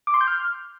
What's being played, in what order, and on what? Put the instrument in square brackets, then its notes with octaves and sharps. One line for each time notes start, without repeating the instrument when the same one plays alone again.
[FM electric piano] D6
C6
G6
F6